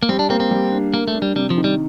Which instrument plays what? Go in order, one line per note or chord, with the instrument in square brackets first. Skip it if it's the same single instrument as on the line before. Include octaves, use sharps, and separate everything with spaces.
[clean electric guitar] A#3
[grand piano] G3 [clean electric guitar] C4
[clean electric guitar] D4
[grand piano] A#3 [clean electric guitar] C4
[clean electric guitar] C4
[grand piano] G3
D4
[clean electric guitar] A#3 [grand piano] A#4
[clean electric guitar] A3
[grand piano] D4
[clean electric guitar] G3
[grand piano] C3 [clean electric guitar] G3
[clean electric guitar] F3
[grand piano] D#3
[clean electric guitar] G3